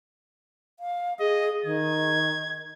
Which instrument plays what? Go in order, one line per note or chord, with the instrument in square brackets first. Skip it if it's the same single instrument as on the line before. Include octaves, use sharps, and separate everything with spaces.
[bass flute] F5
[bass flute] G#4 [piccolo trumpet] D#5
[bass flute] D#3 [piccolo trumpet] G#6